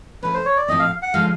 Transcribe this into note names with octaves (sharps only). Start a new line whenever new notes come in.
F3 A3 C#4 B4
C5
C#5
D5
A2 F3 A3 C4 D#5
F5
F#5
D3 F3 G#3 C#4 F5